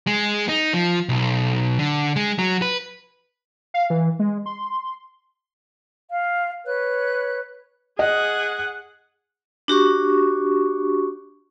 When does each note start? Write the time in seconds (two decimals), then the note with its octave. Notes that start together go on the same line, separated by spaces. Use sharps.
0.07 G#3
0.49 D#4
0.74 F3
1.09 B1
1.79 D3
2.16 G#3
2.39 F#3
2.62 B4
3.74 F5
3.90 E3
4.19 G#3
4.46 C6
6.11 F5
6.66 B4 C#5 F#6
7.99 G#4 D#5 F#5
9.68 D4 F#4 G4 C#6